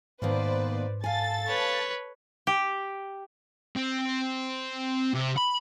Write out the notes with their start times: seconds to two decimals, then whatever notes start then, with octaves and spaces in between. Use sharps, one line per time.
0.22 G#2 B2 D#3 A#3 B4 C5 D5
1.04 A4 F5 G#5 A6
1.48 B4 C#5
2.47 G4
3.77 C4
5.14 C3
5.38 B5